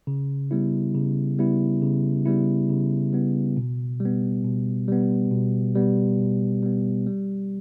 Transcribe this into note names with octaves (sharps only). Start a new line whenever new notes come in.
C#3
G3 B3 E4
C#3
G3 B3 E4
C#3
G3 B3 E4
C#3
G3 B3 E4
B2
G3 B3
B2
G3 B3
B2
G3 B3
B2
G3 B3
G3